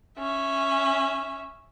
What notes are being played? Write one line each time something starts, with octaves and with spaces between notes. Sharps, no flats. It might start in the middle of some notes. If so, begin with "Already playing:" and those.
C#4 E5